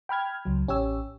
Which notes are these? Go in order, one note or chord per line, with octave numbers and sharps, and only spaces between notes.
G5 B5 F6 G#6
C#2 F#3
A1 C#4 G4 C#5 E6